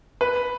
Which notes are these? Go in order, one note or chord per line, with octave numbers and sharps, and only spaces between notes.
B4